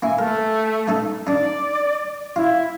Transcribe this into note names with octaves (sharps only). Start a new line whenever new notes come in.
A#3 E4 G#5
A3 A#4
A3 D#4 A4
D4 D#4 D5
E4 F4